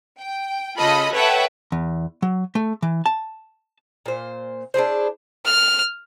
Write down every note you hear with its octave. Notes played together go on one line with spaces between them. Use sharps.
G5
C#3 F4 A4 D#5 B5
A4 B4 C#5 E5 F#5 G5
E2
F#3
A3
E3
A5
A#2 C5
D4 E4 G#4 C5
F6